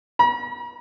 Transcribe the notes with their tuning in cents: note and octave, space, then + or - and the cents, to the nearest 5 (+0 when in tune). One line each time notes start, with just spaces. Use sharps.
A#5 +45